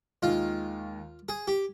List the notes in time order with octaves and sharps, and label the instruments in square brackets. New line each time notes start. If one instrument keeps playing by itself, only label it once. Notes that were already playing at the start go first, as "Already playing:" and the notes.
[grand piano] D#2 D#3 G#3 [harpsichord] F4
[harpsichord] G#4
G4